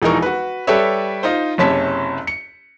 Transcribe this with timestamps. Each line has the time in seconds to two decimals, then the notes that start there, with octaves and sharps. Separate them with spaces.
0.02 E1 E3 F3 D#4 A#4 C#6
0.22 F#4 B4
0.67 G3 G4 A4 B4 C#5 E5
1.23 D#4 F4 C5
1.58 F#1 C3 C#4 C#5 A5 B6
2.27 C#7